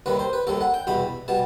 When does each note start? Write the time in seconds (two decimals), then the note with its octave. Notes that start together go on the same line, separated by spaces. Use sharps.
0.06 D#2 D#3 G3 B4
0.19 C5
0.33 B4
0.47 D#2 D#3 G3 A4
0.61 F#5
0.74 G5
0.87 E2 B2 G3 B5
1.28 B2 G3 A5